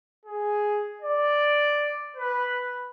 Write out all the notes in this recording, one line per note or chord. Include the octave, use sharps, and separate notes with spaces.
G#4
D5
B4